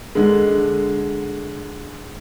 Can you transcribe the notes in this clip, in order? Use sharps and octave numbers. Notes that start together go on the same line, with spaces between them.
D3 G#3